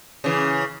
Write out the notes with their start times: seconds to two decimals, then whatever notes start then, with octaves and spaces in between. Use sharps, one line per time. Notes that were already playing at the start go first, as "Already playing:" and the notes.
0.24 C#3 E3